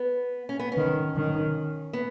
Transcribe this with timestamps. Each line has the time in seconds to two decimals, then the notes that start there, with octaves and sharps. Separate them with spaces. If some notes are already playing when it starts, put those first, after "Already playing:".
Already playing: B3
0.49 C#4
0.59 B3
0.72 C#4
0.77 D#3
1.16 D#3
1.93 B3